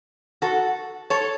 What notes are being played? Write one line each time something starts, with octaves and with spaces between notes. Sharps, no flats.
F#4 A4
A4 C#5